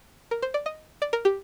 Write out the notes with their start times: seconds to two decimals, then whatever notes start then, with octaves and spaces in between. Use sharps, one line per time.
0.31 A#4
0.42 C5
0.54 D5
0.66 D#5
1.02 D5
1.13 A#4
1.25 G4